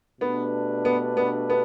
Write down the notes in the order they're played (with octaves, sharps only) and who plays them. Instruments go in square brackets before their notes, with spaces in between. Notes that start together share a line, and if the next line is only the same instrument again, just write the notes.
[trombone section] B2 A3 D4 G4 B4 [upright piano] B3
[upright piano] B3
B3
B3